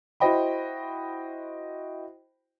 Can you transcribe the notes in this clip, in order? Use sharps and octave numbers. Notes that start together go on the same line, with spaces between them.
E4 F#4 C5 D#5 G5 B5